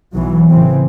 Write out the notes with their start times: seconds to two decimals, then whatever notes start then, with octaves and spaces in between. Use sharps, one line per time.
0.14 B1 E3 F#3
0.51 A2 C#3 E3 C4